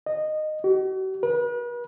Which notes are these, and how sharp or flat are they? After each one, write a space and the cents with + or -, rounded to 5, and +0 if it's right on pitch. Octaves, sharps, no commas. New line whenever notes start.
D#5 -15
F#4 +45
B4 -40